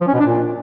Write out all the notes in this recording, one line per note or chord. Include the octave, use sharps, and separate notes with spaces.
F3
C#4
B2
D4
A#2